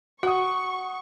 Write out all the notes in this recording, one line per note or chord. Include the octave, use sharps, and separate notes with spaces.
F#4 F#5 C#6 D#6